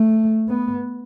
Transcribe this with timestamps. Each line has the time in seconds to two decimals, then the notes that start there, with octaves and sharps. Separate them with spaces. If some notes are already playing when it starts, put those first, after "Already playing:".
Already playing: A3
0.49 B3